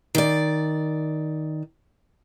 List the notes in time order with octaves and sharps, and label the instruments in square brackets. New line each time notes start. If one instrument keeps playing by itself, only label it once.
[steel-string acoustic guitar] D#3 D5